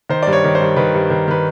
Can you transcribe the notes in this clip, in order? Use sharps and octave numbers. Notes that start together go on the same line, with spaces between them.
D#3 C5
G2 D5
C#5
D#3
C5
G2
D#3 B4
G2
D#3
D#3 B4